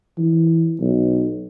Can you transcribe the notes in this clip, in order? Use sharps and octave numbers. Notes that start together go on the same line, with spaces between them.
E3
B1